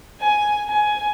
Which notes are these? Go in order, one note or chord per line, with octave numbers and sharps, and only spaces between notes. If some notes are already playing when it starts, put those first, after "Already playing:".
G#5
G#5